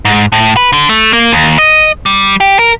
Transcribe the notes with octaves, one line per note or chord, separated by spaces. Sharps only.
G#2
A2
B4
D3
A3
A#3
D#2
D#5
G3
G4
A#4